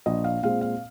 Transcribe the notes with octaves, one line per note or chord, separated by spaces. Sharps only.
A#1 D#5
F5
A#2 G#3 C4 F5
F5